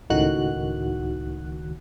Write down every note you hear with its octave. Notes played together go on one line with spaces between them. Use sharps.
C#2 A2 D#3 F#4 F#6